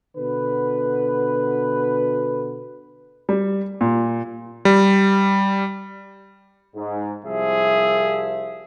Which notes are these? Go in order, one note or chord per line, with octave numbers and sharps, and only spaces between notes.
B2 D3 B4
G3
A#2
G3
G#2
C2 F3 G#4 E5